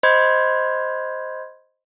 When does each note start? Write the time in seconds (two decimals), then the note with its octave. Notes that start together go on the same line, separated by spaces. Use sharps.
0.03 C5 D#5 B5 C6 G6 G#6